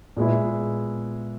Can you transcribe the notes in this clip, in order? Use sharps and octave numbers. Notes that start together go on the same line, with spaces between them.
A#2 G#3 B3 E4